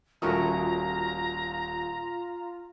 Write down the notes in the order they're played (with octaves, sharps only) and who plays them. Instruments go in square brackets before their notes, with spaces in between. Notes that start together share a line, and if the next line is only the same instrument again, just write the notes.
[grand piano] D#1 A#4 D#6 [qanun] A3 C#4 F#4 [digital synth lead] F4 [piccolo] A#5